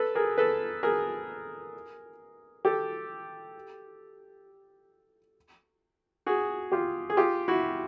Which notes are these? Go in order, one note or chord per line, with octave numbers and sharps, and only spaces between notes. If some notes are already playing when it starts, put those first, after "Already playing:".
Already playing: A4 B4
G#4 A#4
A4 B4
G#4 A#4
G4 A4
F#4 G#4
F4 G4
G#4
F4 G4
E4 F#4